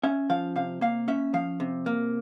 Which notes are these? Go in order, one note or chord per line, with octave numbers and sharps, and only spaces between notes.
C#4 E5
F3 F5
C3 F5
A#3 F5
C#4 E5
F3 F5
C3
A#3